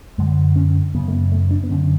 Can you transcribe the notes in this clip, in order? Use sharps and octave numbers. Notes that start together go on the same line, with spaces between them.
F#2 D3 G#3
C#4
F#2 C#3 B3
A3
B3
A3
D4
B3
F#2 D3 C#4